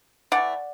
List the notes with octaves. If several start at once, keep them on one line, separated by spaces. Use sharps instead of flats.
E3 A3 D5 F#5